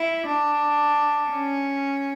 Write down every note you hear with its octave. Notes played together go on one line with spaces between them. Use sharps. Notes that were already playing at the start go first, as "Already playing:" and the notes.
Already playing: E4
D4
C#4